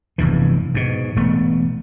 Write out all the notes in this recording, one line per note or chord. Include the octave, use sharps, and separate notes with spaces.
F1 E2 G2 E3
G#2 B2
E1 A3 B3